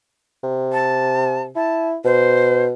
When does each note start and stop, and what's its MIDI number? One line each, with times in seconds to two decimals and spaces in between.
0.43 1.50 48
0.73 1.42 81
1.56 1.96 64
1.56 1.88 81
2.05 2.73 47
2.05 2.64 72